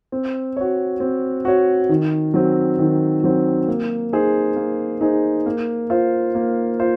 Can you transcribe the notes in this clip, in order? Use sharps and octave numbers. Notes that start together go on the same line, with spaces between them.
C4
F#4 C#5
C4
F#4 C#5
D#3
F#3 C4
D#3
F#3 C4
A#3
D#4 G#4 C5
A#3
D#4 G#4 C5
A#3
F4 C5
A#3
F4 C5